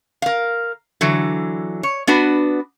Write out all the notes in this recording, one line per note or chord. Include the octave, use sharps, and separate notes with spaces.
A#4 F5
D3 E3 F#3
C#5
B3 D4 F#4 B4